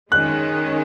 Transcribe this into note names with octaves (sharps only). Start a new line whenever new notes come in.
D#3 G#3 C#4 F#6